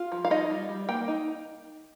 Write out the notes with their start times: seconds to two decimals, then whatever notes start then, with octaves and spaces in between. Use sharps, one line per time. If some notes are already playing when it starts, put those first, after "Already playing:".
Already playing: F4
0.12 F3
0.25 F5
0.31 D#4 D#5
0.50 G3
0.69 G3
0.89 A#3 G5
1.08 D#4